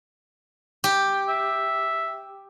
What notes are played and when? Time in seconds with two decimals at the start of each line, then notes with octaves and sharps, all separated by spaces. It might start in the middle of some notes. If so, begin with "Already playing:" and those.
0.84 G4
1.29 E5